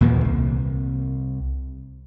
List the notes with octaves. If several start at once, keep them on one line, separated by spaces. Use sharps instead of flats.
D#2 A#2 D#3 E3
C2